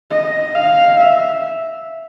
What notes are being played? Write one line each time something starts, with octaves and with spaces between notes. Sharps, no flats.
D#5
F5
E5